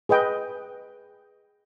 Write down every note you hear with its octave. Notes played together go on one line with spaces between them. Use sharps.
G#4 B4 D#5 G5